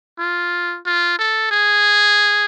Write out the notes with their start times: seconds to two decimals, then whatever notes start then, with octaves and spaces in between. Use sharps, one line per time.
0.19 F4
0.86 F4
1.19 A4
1.51 G#4